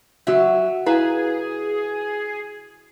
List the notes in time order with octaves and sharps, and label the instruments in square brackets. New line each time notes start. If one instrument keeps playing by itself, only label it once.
[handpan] C#3 F#4 [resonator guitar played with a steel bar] F#3 E5
[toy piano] E4 F5 A#5 [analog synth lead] G#4 [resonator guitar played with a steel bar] B4